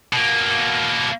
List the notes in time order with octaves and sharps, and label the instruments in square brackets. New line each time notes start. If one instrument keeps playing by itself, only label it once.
[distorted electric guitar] B2 A#3